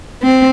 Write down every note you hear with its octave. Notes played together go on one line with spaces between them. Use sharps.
C4